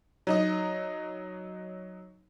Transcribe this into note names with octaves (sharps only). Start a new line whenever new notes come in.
F#3 D#4 D#5